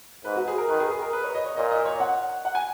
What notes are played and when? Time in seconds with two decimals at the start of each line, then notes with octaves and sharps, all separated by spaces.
0.24 G#2 B4
0.36 F#4
0.47 G#4
0.58 A#4
0.68 D#3 B4
0.80 G#4
0.90 G#4
1.02 A#4
1.13 B4
1.24 C#5
1.35 D#5
1.46 C#5
1.56 A#2 D#5
1.71 D#5
1.86 C#5
2.00 F#5
2.45 F#5
2.55 G#5